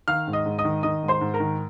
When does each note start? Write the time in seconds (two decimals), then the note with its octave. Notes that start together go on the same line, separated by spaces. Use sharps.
0.08 D#3 F5 F6
0.27 G#2
0.33 D#5 D#6
0.46 G#2
0.58 D#5 D#6
0.65 D#3
0.83 D#3 D#5 D#6
1.03 G#2
1.08 C5 C6
1.21 G#2
1.34 A#4 A#5
1.40 D#3